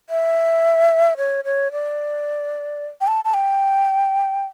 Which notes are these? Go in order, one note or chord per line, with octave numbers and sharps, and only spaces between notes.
E5
C#5
C#5
D5
G5
A5
A5
G5